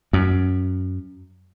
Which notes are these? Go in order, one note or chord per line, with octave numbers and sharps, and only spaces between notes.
F#2